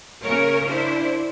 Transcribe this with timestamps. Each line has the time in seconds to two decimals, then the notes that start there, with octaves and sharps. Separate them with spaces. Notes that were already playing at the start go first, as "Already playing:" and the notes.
0.23 C#3 A#3 A#4 C#5
0.67 D4 E4 C5